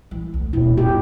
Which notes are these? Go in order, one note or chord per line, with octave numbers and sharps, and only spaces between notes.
E3
D2
D#1 B2 E4
G1 G4